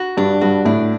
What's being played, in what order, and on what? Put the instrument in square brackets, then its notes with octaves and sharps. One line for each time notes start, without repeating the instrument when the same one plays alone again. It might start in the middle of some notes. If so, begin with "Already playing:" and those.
Already playing: [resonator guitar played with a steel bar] F#4
[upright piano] G2 [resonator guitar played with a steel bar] D4
[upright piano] G2 [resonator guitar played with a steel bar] F#4
[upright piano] A2 [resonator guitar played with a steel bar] D4